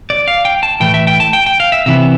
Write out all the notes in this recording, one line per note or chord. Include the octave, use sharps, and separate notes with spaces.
D5
F5
G5
A5
A2 E3 A3 G5
E5
G5
A5
G5
G5
F5
E5
C3 E3 B3 E5